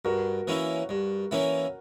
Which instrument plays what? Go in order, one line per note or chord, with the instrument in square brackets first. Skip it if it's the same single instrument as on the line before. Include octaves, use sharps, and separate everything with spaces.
[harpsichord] G2 [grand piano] F#4 A#4
[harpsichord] E3 A#3 C#4 E4
G2
E3 A#3 C#4 E4